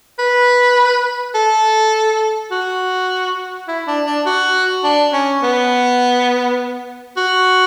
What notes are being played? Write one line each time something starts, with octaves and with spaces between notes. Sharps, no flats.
B4
A4
F#4
E4
D4
D4
F#4
D4
C#4
B3
F#4